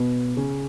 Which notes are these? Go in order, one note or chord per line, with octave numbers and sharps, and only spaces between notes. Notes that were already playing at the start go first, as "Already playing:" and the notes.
Already playing: B2 B3
C#3 C#4